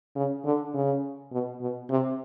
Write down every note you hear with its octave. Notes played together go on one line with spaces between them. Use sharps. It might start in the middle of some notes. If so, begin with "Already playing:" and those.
C#3
D3
C#3
B2
B2
C3